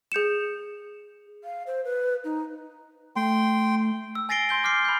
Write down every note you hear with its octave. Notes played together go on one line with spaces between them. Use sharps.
G#4 G6 C#7 E7
F5
C5
B4
D#4
A3 G5 C6
E6
G#5 A6 A#6 C7 D7 G7
C6 G6 G7
C6 D6 F6 G6 C7 D7
B5 G6